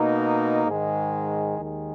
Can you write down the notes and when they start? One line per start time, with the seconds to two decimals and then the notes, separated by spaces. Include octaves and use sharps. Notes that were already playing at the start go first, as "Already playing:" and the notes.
Already playing: B2 A#3 D#4
0.66 G#2 D#3 G#3
1.59 D#2 D#3 G#3